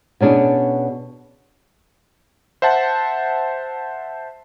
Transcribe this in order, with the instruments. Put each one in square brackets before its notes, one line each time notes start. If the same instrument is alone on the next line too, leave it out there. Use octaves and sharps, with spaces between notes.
[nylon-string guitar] B2 C#4 D4 G#4
[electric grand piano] C5 E5 F#5 A5